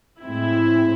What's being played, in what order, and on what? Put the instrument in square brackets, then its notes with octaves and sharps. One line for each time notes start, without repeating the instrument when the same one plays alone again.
[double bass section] A2 G#3 C4 [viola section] E4